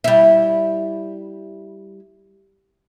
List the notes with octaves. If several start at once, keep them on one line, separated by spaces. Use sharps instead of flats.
G3 E4